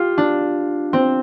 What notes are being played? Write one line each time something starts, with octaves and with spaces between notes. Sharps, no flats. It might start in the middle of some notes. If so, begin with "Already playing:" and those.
Already playing: F4 G4
D4
C4